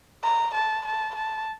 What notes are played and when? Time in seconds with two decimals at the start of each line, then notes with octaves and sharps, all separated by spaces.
0.23 A#5
0.54 A5
0.86 A5
1.15 A5